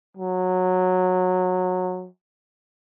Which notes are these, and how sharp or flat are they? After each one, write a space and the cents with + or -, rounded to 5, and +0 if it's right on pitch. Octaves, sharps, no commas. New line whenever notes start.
F#3 -15